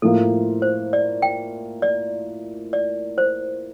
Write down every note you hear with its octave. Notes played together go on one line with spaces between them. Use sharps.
A2 F3 A#3 A4
C5
D5
G5
D5
D5
C5